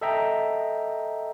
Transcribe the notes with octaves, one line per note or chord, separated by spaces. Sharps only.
A4 D#5 E5 G5 A#5